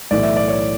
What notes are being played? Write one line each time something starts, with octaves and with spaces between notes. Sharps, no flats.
B1 A2 E3 D5
E5
D5
C#5